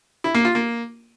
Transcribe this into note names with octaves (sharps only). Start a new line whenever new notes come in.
E4
A#3
F4
A#3